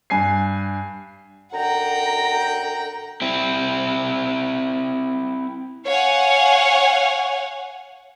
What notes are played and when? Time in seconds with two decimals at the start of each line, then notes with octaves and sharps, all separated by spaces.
0.10 G2 G#5 C7
1.53 F#2 D3 F#5 G5 A#5
3.22 C4 E4
5.86 C#5 F5 F#5 G#5